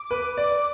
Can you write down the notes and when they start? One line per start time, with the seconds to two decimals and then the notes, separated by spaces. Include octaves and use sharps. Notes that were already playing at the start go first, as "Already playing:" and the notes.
Already playing: D6
0.11 B4
0.37 D5